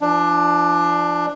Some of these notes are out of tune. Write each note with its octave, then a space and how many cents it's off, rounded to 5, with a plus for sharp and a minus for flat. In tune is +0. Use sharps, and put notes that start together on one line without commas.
F3 -30 D4 +15